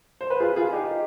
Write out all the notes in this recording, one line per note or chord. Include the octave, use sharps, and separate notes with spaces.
C5
B4
F4 G#4
F4 G#4
D#4 G4